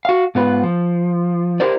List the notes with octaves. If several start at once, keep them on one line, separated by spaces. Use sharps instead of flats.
F#4 F5
G#2 B3 F4 B4
F3
E4 G4 A#4 C5 D5